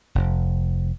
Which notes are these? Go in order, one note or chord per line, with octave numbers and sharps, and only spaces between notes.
F1